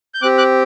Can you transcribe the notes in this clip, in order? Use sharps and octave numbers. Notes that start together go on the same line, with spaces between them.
G6
C4 G4 D6 F#6
D6 F#6